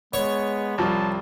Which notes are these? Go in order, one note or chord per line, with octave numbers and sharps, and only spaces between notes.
G#3 B3 C#5
C2 F3 G3 A5